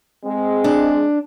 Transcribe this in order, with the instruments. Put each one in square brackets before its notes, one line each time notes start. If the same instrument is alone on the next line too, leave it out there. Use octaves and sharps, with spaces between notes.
[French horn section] G#3 C4
[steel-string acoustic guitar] D4